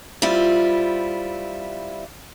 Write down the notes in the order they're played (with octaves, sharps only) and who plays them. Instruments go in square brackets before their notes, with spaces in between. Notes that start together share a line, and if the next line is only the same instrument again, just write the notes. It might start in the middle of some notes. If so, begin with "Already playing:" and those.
[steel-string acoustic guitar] G3 C4 E4 F4